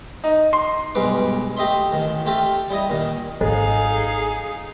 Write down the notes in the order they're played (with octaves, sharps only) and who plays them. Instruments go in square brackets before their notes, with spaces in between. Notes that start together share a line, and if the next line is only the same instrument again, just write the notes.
[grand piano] D#4
C6
[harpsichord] B1 G2 G#3 B4 D6
A3 G4 D#5 E5 C6
A1 D#3
A3 F4 G4 A4 E5
G3 E4 D#5 D#6
A#2 D#3
[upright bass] G#1 [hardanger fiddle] D#4 F5 [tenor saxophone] G#4 [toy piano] A4 C5 D#5